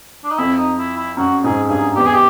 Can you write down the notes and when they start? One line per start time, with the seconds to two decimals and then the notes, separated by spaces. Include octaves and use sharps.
0.24 D4
0.31 D#4
0.38 F2 E4
0.58 D#4
0.78 E4
0.97 E4
1.17 F#2 F#4
1.43 G#2 G#4
1.69 G2 G#4
1.96 E2 G4
2.05 G#4
2.14 G4